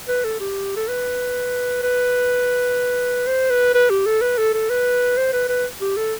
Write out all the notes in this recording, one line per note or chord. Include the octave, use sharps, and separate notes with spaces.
B4
A4
G4
A4
B4
B4
C5
B4
B4
G4
A4
B4
A4
A4
B4
C5
B4
B4
G4
A4